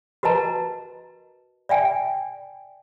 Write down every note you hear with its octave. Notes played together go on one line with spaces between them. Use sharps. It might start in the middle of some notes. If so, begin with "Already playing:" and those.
F#4 A#4 B4 D#5 A5 A#5
D5 E5 G5 G#5